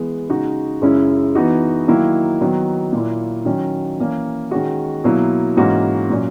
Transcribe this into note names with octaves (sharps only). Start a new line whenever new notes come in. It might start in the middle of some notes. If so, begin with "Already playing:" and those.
Already playing: E3 G#3 B3
C#3 G#3 D#4 F#4
F#2 C#3 G#3 C#4 E4
E3 B3 D#4 F#4
D#3 F#3 A#3 E4
D#3 F#3 B3
A#2 F#3 A#3 E4
D#3 F#3 C#4
E3 A#3 C#4
D#3 G#3 C#4 F#4
B2 F#3 A#3 E4
G#2 E3 A#3 C#4 F#4
A#2 F#3 C#4